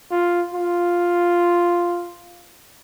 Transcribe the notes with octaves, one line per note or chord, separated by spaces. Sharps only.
F4
F4